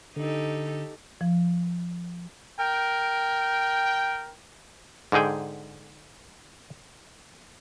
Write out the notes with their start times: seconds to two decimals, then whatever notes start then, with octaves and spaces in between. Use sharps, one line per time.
0.16 D3 D#4 G4 A4
1.21 F3
2.60 A#4 G5
5.12 G#2 D3 D#4 G#4 G5